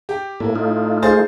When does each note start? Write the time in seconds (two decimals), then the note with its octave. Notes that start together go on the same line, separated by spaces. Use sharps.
0.09 G4 G5
0.40 A2 A3 A#3
0.56 A3 D#4 F4
1.03 G#4 C5 A6